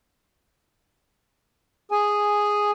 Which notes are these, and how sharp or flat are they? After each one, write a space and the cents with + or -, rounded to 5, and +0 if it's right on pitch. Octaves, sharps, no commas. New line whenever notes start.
G#4 -5 G#5 +0